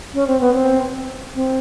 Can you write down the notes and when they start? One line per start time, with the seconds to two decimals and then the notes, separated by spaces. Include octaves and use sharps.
0.14 C#4
0.27 C4
0.41 B3
0.54 C4
1.35 C4